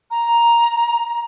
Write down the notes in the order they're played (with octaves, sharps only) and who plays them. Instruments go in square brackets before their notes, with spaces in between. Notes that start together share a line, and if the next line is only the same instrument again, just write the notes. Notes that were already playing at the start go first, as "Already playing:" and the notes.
[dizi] A#5